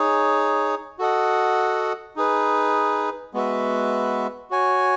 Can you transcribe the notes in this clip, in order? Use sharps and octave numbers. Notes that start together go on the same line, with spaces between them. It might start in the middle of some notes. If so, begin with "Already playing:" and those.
Already playing: D#4 G#4 C#5
F#4 A4 D#5 F#5
D#4 G#4 B4
G#3 B3 F#4 B4 E5
F#4 C#5 G#5